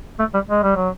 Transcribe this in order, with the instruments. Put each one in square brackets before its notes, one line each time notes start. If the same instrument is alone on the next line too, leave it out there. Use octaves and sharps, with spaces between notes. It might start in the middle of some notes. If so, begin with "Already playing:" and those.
[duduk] A3
G3
G#3
G3
F#3